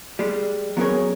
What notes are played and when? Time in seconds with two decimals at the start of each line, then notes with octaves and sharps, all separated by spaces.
0.19 G3 G#3
0.77 F#3 B3 C#4 G#4 A#4 C#5